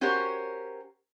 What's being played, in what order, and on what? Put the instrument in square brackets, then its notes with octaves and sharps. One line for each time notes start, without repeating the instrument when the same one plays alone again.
[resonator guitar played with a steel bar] C#4 F#4 G4 A#4 C5 C#5